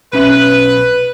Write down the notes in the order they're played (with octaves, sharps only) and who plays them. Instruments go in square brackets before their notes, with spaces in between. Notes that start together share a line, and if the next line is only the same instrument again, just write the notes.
[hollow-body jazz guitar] B1 C#4 E5 [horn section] B4